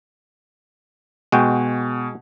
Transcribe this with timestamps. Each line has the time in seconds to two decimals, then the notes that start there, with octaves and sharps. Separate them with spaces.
1.32 B2 G#3 F#4 G5